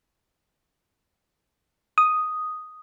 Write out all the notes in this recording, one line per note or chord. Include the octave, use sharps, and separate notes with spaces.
D#6